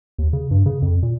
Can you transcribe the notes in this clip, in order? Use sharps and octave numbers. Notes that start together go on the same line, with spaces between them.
D#2
C#3
G2
C#3
F2
A#2